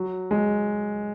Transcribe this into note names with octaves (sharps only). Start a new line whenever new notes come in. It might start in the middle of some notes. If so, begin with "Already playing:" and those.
Already playing: F#3
G#3